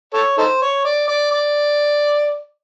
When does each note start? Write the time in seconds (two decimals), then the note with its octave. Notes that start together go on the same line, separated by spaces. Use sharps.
0.14 A4 C#5
0.38 D#4 A4 C5
0.62 C#5
0.85 D5
1.08 D5
1.31 D5